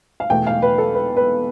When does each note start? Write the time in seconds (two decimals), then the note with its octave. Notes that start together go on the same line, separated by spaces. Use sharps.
0.20 F5
0.30 E2 B2 A3 G5
0.47 F5
0.62 B4
0.78 A4
0.95 B4
1.17 B4